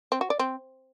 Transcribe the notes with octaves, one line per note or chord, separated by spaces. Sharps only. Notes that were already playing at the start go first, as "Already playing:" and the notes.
C4
F#4
D5
C4